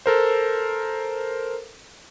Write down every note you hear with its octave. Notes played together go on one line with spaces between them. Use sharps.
A4 A#4 C5